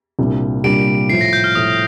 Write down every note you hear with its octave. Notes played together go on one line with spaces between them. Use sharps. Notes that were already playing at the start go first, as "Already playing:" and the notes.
C2 A#2 G3 D4 G4
C2 A#2 G3 D4 G4 D7
A2 F3 A3 C7
A#6
G6
F6
A2 F3 A3 D#6